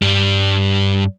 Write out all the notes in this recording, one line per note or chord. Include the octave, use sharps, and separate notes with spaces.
G2 G3